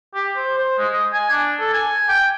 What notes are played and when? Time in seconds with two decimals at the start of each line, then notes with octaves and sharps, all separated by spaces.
0.15 G4
0.36 C5
0.58 C5
0.79 G#3
0.93 D#5
1.13 G#5
1.31 D4
1.60 A4
1.73 G#5
2.08 G5